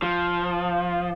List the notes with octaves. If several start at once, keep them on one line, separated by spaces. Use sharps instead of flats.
F3